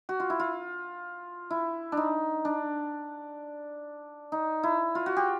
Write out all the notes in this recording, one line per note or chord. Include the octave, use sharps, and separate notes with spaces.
F#4
F4
E4
F4
E4
D4
D#4
D4
D#4
E4
F4
F#4
G4